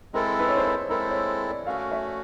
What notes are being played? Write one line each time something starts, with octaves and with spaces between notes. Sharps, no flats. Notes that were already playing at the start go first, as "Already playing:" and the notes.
G#3 C4 E4 A4 A#4
B4
C#5
C5
B4
G#3 C4 E4 A4 A#4
C#5
D5
A3 C#4 F#4 F5
E5